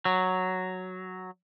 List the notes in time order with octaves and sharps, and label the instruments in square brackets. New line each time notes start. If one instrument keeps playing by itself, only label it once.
[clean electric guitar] F#3